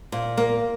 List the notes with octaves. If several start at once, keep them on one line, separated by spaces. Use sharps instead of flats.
A#2
A#3